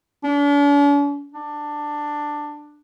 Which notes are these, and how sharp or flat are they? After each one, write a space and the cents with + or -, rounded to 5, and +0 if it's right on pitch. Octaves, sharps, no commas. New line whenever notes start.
D4 -45
D4 +10